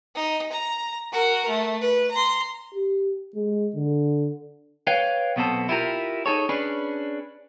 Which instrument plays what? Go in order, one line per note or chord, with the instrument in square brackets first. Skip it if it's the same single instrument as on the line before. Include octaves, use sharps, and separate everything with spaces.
[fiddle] D#4
A#5
F#4 A#4
A3
B4
A#5 C6
[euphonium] G4
G#3
D3
[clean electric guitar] B4 C#5 F5 G5
B1 B2 B3 C4 A4
E4 F4 G4 A#4
D#4 G#4 A4 C#5
C#4 D4 G#4 B4